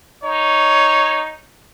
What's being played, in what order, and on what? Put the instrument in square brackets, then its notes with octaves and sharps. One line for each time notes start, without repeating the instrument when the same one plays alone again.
[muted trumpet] D#4 [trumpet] C#5